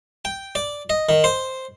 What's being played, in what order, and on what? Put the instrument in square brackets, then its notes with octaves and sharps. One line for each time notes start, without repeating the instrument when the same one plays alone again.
[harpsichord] G5
D5
D#5
D#3
C5